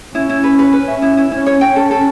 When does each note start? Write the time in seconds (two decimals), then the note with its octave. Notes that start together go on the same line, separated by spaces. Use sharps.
0.14 C#4 E4
0.29 E4
0.44 B4
0.59 B4
0.73 B4
0.88 E5
1.02 E4
1.17 E4
1.32 C#4 E4
1.46 C#5
1.61 G5
1.76 A4
1.91 A4